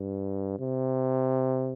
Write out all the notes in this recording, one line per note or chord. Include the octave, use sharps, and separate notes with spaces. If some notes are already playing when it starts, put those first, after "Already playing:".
Already playing: G2
C3